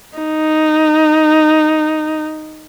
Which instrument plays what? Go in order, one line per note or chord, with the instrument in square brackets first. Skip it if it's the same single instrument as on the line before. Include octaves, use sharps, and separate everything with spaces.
[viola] D#4